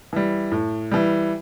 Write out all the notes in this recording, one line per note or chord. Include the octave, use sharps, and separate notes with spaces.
E3 G3
A2
E3 G3